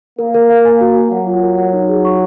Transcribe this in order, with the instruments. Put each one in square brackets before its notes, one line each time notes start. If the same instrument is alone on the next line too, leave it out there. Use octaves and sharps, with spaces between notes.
[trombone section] A#3 [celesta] A#4
[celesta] A#4
F5
G#5
F#4
A#4
[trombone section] F#3 [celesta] F#5
[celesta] F4
A#4
F#5
D#4
G#4
C#6